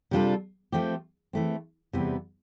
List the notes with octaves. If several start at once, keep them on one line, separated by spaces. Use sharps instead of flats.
C3 G3 D4 F4 A4
F3 A3 C4 G4
E3 A3 C4
E2 C3 E3 G3 B3